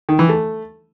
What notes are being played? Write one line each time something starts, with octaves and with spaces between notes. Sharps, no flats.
D#3
E3
A3